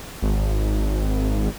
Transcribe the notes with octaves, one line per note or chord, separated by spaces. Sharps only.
G#1